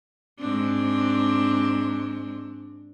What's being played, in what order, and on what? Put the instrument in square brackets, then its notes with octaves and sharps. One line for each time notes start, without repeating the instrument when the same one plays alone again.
[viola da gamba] G#2 C4 D4